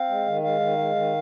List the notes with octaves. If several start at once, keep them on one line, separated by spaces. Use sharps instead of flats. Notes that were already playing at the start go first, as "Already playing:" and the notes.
Already playing: C4 F5
G#3
D#3
G#3 F5
D#3
G#3
D#3